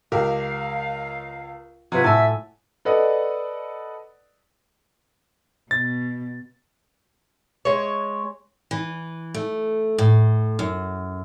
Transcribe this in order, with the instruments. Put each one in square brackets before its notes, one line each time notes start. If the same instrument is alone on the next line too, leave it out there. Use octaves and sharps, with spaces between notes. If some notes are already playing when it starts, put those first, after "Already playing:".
[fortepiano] C#2 A#4 [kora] G4 [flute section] F5
[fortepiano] C3 [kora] F#3 F4 F#4 [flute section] B4 G#6
[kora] A2 [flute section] E5 E6 [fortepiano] G#5 A5
[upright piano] A4 B4 D5 D#5 F#5
[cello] B2 [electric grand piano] A6
[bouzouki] G#3 C#5
[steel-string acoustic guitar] E3
A3
A2
F#2